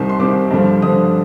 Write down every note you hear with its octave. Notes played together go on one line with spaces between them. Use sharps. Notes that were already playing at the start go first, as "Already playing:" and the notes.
Already playing: C2 C3 D#3
C6
C2 C3 D#3 D6
G2 D3 F3
G2 D3 F3 D#6